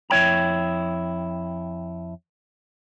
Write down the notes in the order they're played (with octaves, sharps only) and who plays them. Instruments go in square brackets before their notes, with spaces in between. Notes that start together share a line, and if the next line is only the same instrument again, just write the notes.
[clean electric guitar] F2 E4 C#5 G5 A#5